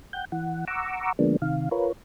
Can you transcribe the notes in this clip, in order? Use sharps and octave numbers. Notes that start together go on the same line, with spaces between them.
F#5 G5 G6
E3 F#5
F#5 A#5 C#6 D6 E6
D3 F3 G#3 A#3 B3 D4
C3 D#3 F5
F4 A#4 B4 C#5